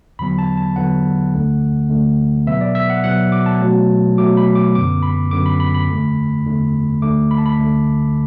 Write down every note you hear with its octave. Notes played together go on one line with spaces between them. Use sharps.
E2 D3 F#3 B3 B5
A5
A5
E2 D3 F#3 B3 F#5
D2 D3 A3
D2 D3 A3
B2 F#3 B3 E5
D5
E5
F#5
B2 F#3 B3 F#5
D6
A5
B2 F#3 A3
B2 F#3 A3 D6
B5
D6
F#2 D3 B3 D6
B5
F#2 D3 B3 D6
B5
B5
B5
E2 D3 A3
E2 D3 A3
D2 D3 A3 D6
B5
A5
B5
D2 D3 A3